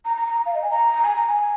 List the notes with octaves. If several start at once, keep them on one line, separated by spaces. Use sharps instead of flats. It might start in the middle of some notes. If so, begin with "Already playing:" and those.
A#5
A#5
A#5
F5
D#5
G#5
A#5
G#5
A#5
G#5